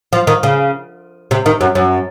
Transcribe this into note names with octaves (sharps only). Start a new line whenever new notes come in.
F3
D#3
C#3
C3
D#3
F#2
F#2